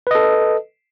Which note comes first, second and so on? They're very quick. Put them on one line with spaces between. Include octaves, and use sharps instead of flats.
B4 D#5 A4